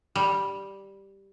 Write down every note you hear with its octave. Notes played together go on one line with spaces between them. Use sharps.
G3